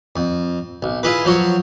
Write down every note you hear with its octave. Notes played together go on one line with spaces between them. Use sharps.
F2
B1
E4 F4 G#4 B4
F3 F#3 C#5